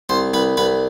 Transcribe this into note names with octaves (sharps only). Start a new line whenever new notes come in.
C2 C5
C2 B4
C2 B4